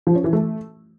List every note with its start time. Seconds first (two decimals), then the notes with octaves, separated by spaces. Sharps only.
0.07 F3
0.15 C#4
0.24 E3
0.33 A3